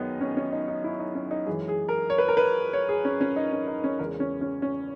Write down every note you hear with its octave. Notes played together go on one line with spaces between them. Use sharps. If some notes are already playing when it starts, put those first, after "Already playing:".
Already playing: F#2 D#3 G#3 B3 D#4
C#4
C#4
D#4
D#4
E4
D#4
C#4
D#4
F#2 E3 G#3 G#4
G#4
A#4
C#5
B4
A#4
B4
C#5
G#4
C#4
C#4
D#4
C#4
D#4
C#4
E2 C#3 G#3 A#4
C#4
C#4
C#4